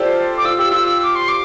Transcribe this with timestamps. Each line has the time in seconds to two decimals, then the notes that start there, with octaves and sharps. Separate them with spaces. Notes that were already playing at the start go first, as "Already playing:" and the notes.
Already playing: F4 G4 A4 C5 D5
0.37 D6
0.45 F4 E6
0.58 G4 E6
0.72 F4 E6
0.88 E6
1.03 D6
1.15 C6
1.28 D6